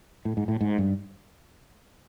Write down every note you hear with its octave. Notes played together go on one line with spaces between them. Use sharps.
A2
G#2
A2
G#2
G2